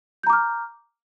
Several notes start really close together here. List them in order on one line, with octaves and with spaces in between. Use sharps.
G6 A#5 D6 F6